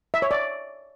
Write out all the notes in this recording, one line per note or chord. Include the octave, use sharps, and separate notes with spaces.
E5
C#5
D5